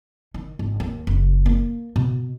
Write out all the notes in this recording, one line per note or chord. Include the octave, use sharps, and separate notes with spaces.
D#3
G#1
D#2
F#1
A#3
B2